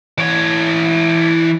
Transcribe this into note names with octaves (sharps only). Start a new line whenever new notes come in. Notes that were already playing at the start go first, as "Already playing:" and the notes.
E3 C#5